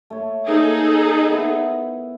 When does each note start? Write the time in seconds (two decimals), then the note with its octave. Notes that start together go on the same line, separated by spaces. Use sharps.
0.10 A3 C#5
0.48 A#3 D#4 G#4 A4 C5 F5
1.28 B3 E4